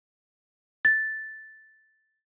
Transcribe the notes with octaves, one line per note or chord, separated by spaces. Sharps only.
A6